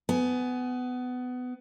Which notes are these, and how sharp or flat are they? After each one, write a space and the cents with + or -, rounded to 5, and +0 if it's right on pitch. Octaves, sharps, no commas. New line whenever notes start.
B3 +20 G#5 +15